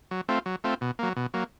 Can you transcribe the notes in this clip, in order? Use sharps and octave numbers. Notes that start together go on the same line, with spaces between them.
F#3
A3 C4 F4
F#3
A3 C4 F4
B2
F#3 A#3
B2
F#3 A#3